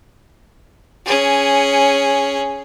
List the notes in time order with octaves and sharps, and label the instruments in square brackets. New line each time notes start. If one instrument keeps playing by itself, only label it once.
[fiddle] C#4 G#4